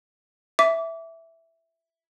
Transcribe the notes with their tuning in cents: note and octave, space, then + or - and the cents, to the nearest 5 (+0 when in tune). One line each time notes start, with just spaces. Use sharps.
E5 +0 D6 -25